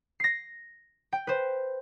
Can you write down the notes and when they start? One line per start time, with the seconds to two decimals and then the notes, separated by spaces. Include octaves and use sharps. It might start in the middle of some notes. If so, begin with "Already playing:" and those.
0.20 A#6 C7
1.13 G5
1.27 B4 C5